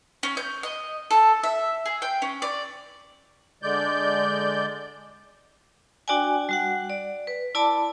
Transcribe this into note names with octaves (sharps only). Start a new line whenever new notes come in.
C#4
G6
D#5
A4
E5
G#4
G5
C#4
D5
D3 G#3 D5 G6
D4 F#4 D5 G5 G#5
G3 F#4 F#5
D5
B4
E4 D5 A5 B5 D6